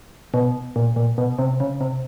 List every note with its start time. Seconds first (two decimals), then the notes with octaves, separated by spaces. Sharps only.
0.34 B2
0.76 A#2
0.96 A#2
1.18 B2
1.39 C3
1.60 C#3
1.81 C3